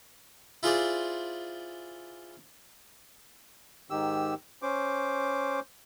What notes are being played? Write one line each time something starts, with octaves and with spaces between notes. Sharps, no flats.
E4 F4 G#4 C5 D5
G#2 D#3 G4 E6
C#4 C5 D6